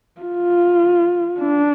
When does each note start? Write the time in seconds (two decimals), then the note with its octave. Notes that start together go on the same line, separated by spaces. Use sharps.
0.21 F4
1.40 D4